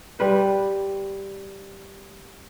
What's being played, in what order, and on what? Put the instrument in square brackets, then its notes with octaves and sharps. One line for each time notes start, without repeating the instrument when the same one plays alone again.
[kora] G3 B4 C5